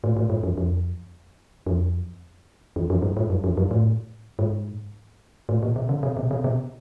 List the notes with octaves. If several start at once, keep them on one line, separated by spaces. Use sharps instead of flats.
A2
A2
G#2
F2
F2
F2
E2
F2
G2
G#2
F#2
F2
F#2
A2
G#2
A2
A#2
B2
C#3
C3
B2
C3
B2